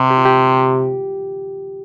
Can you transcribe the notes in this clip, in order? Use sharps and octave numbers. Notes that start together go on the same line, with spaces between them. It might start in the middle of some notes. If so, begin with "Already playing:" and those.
Already playing: C3 G4
G4
F4
G4